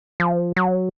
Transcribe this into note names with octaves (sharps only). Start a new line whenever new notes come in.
F3
F#3